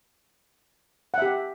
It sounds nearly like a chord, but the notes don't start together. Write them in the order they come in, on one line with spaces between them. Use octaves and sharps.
F#5 E5 G4